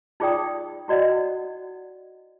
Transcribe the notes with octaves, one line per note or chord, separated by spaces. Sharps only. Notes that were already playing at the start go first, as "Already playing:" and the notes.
D#4 F4 G#4 D5 G5 D#6
E4 F#4 D5 D#5 F#5